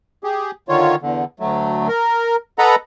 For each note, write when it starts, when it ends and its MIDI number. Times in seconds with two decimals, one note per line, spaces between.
0.24 0.51 67
0.24 0.51 68
0.69 0.96 50
0.69 0.96 51
0.69 0.96 65
0.69 0.96 73
1.02 1.25 40
1.02 1.25 50
1.40 1.88 38
1.40 1.88 54
1.40 1.88 57
1.88 2.36 70
2.59 2.75 69
2.59 2.75 71
2.59 2.75 75
2.59 2.75 78
2.59 2.75 82
2.59 2.75 83